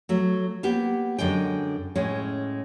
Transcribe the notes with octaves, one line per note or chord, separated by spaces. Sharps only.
F#3 A3
A#3 B3 G4
F#2 D3 G#3 G5
A2 G#3 C#4